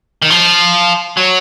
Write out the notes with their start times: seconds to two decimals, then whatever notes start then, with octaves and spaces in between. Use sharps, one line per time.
0.22 D#3
0.30 F3
1.17 F#3